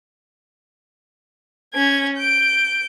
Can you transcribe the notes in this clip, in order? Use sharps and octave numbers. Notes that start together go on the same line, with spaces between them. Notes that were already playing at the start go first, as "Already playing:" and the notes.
C#4 G#6
G6 D7